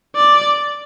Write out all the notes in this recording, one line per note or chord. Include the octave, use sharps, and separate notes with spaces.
D5